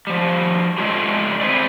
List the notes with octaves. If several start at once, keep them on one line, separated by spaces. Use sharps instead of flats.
F3 G3
G#3 A3 C#4 D4 F4 G4
E3 C4 G#4 B4 C5 D5